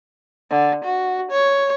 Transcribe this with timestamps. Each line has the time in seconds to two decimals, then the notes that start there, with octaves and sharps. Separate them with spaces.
0.51 D3
0.84 F#4
1.31 C#5